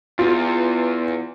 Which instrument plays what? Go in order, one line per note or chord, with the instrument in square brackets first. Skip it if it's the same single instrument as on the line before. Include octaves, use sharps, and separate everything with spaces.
[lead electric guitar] E2 [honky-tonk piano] F4